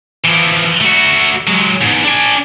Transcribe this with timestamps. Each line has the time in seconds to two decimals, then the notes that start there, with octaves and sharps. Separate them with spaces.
0.25 E3 F3
0.81 A3 F#4
1.47 F#3 G#3
1.82 E2 G#2
2.05 D4 G#5